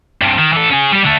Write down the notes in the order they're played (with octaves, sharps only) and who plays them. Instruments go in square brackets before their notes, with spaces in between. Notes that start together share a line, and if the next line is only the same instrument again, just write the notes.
[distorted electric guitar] G2 C3
D#3
E3 A4
C#4 G#4
G3 G4
D3 A3